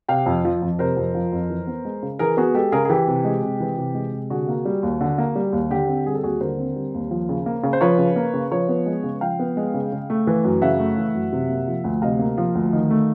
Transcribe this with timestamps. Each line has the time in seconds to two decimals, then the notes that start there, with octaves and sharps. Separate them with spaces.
0.09 C3 F5 G5
0.26 F2
0.45 F3
0.62 F2
0.79 C3 A#4 C5
0.97 F2
1.14 F3
1.32 F2
1.50 E3
1.67 B3
1.85 G#3
2.03 C#3
2.19 E3 G#4 A#4
2.37 B3 F#4 G#4
2.54 G#3 G4 A4
2.72 C#3 G#4 A#4
2.85 G#4
2.90 E3 G4
3.08 C3
3.25 G#3
3.43 C3
3.60 E3
3.78 C3
3.95 G#3
4.13 C3
4.30 D3 F#4 G#4
4.48 A#3
4.65 G3
4.83 D#2
5.01 D3
5.18 A#3
5.36 G3
5.53 D#2
5.70 D3 G4
5.88 C4
6.06 G3 G#4
6.15 A4
6.23 D#2 F#4 G#4
6.41 D3 A#4 C5
6.58 C4
6.76 G3
6.94 D#2
7.11 F3
7.29 C#3
7.46 A#3
7.63 C#3
7.73 C5
7.81 F3 B4 C#5
7.98 C#3
8.16 A#3
8.34 C#3
8.51 F3 B4 C#5
8.69 B3
8.86 G#3
9.04 C#3
9.21 F3 F5 G5
9.40 B3
9.57 G#3
9.74 C#3
9.92 C#3
10.10 A3
10.27 E3
10.44 F#2
10.62 C#3 E5 F#5
10.80 A3
10.97 E3
11.15 F#2
11.33 C3
11.49 A#3
11.68 F3
11.84 D2
12.02 C3 D#5 F5
12.19 A#3
12.38 F3
12.55 D2
12.73 D#3
12.90 A3